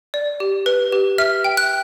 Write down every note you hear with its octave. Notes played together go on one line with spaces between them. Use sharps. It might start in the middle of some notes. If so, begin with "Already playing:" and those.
D5
G4
B4
G4
E5 F6
G5
F#6